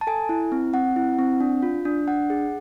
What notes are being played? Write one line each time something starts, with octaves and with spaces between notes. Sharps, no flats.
A5
A4 G#5
E4
C4
C4 F#5
E4
C4
D4
F4
D4
D4 F#5
G#4